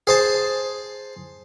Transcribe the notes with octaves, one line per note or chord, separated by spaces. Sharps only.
G#4 C5 A5